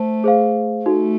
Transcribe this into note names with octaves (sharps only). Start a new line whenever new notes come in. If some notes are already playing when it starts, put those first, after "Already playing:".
Already playing: A3 C5 A5
G#4 C5 F5
A3 D#4 F#4 A4